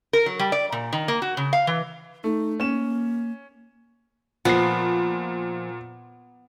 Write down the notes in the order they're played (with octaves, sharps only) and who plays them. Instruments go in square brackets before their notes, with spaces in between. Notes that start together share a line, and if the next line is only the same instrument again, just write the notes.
[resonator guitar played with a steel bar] A#4
F#3
G3
D5
A#2
D#3
A#3
F#4
C#3
F5
E3
[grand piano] A3 [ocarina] D#4
[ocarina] A#3 [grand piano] C#4 E7
[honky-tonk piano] A#2 C7 [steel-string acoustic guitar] F3 [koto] B3